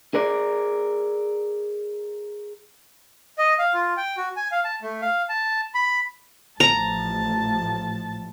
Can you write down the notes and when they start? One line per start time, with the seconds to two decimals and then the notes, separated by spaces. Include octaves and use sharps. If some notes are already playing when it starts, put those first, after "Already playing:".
0.14 G#4 A#4 D5
3.38 D#5
3.59 F5
3.74 F4
3.97 G5
4.17 F#4
4.36 G#5
4.52 F5
4.64 A5
4.82 A3
5.02 F5
5.29 A5
5.75 B5
6.60 A1 A2 F3 A5 A#5